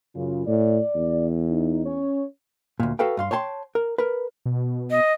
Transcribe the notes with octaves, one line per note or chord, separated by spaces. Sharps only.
F#2 C#3 F4
A2 D5
E2
D#4
C#4 C#5
D2 A#2
F#4 A4 B4 F5 G5
G2 F5 C6
C#5 G5 A5 C6
A#4
A#4 B4
B2
D#5